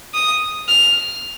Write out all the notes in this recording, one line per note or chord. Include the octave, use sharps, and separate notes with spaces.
D#6
F6